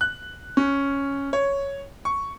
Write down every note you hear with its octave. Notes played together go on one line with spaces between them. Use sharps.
F#6
C#4
C#5
C#6